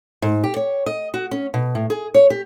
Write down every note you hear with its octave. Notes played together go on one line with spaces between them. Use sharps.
G#2
G4
C#5
D#5
F#4
C#4
B2
A2
G#4
C#5
G4